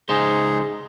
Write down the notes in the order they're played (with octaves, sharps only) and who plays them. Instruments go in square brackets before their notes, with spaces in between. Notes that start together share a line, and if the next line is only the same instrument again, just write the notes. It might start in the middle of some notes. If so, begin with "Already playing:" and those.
[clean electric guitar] C#2 D#4 C5 [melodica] G#4